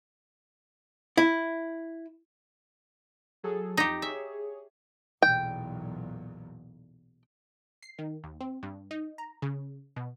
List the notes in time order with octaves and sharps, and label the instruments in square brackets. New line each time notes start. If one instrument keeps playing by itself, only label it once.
[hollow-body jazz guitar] E4
[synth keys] F#3 G#4 A4
[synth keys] F2 [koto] D#4 G4
[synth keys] G#4 C#5 [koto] E5
[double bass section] B1 E2 A#2 [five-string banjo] G5
[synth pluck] C7
D#3
D#2
C4
G2
D#4
A#5
C#3
B2